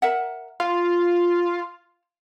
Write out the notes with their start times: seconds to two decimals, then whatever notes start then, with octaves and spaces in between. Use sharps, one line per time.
0.02 A#4 E5 F#5
0.60 F4 F5